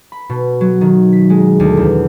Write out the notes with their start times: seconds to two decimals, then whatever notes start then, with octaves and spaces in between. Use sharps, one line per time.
0.12 B5
0.29 B2
0.61 F#3
0.81 D#3
1.13 B6
1.30 G#3
1.60 D2
1.77 E2